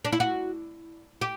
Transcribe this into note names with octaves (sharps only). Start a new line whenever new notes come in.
D4
E4
F#4
G4